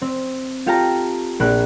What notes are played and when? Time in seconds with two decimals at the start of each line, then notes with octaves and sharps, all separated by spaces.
0.02 C4
0.66 F4 G4 A4 F5 A5 A#5
1.40 A#1 A#3 B5 F#6